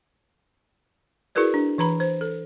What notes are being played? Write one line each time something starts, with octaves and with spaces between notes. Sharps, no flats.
E4 F#4 G#4 A#4 B4 D5
D4
E3 B4 A#5 B5
C5
A4